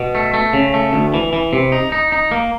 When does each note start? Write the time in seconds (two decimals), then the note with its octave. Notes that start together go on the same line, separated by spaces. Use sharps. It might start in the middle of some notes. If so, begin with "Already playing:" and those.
Already playing: B2
0.15 A3
0.34 A3
0.53 C#3
0.74 A3
0.93 D2
1.14 E3
1.33 E3
1.53 C3
1.72 D#4
1.92 D#4
2.12 D#4
2.31 A#3